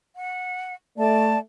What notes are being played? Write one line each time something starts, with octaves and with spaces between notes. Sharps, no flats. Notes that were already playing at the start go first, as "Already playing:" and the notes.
F#5
A3 D5 A5